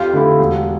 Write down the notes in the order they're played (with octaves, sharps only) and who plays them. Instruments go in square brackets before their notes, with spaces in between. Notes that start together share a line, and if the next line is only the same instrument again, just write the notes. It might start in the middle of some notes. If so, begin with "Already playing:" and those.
Already playing: [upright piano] F2 [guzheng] F4 G4
[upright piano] D3 A3 E4
E1